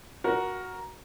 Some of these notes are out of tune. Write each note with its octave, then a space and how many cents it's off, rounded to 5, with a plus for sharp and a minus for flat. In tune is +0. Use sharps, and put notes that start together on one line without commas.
F#4 +0 A#4 +10